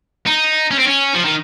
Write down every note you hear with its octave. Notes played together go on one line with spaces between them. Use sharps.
D#4
C#4
C4
C#4
F3
D#3